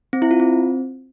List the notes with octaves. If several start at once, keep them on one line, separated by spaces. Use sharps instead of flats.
C4
E4
F4
C4